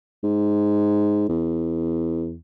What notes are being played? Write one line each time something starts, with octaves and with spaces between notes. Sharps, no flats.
G#2
E2